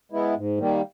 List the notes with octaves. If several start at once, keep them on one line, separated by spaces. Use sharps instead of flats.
G#3 B3 E4
G#2
D#3 G3 A#3